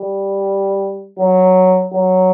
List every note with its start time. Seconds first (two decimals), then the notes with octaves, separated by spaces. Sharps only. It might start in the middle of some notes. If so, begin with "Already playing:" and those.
Already playing: G3
1.19 F#3
1.92 F#3